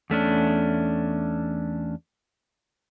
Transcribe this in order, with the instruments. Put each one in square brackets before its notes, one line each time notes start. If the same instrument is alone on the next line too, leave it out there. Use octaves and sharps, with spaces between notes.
[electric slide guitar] E2 A3 C#4 D4